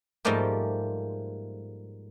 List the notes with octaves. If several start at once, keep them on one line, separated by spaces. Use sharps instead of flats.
G#2 F3 G3 A3 A#3 G4